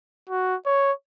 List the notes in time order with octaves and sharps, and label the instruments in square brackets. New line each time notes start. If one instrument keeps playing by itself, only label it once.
[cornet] F#4
C#5